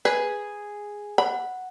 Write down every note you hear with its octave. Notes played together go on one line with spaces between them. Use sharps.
G#4 B4
F#5 B5